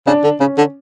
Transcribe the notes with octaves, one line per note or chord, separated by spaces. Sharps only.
C#3 D4
D3
C#3 C#4
D3